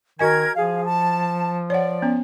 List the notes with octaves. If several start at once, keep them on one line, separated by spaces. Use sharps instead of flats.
D#3 F#4 A#4 D#5 G#5 G#6
F3 G#4 F5
A5
C#5 D5 F#5
B3 C#4